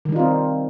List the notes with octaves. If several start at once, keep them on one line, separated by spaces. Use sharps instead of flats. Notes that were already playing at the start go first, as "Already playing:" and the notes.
D#3 G3 C4 D#4 F4